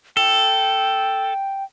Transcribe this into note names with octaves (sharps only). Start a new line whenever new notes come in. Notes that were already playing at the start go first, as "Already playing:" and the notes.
A4 G5